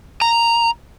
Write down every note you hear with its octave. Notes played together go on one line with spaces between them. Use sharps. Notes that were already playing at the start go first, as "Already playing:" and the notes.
A#5